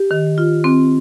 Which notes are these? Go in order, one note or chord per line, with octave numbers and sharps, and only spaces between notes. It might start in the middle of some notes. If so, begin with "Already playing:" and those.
Already playing: G4
D#3
F4
C4